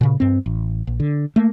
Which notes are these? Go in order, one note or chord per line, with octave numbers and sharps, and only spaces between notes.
A#2 C#3
G2 C4
A1
A#1
D3
A3 A#3